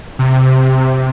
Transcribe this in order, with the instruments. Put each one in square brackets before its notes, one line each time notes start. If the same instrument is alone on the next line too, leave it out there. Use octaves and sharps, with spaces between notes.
[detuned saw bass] C3